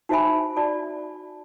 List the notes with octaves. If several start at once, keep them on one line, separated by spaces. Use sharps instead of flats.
D#4 F#4 C5 E5 G#5 B5
F#4 D5 A5